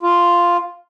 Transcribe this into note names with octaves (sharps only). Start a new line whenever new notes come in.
F4